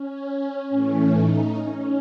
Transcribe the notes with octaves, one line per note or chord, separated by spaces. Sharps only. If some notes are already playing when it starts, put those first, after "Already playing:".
Already playing: C#4
A2 E3 A3
D#4
C#4